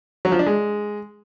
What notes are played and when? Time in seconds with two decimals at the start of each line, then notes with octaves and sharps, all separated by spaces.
0.25 F#3
0.32 F3
0.39 D4
0.46 G#3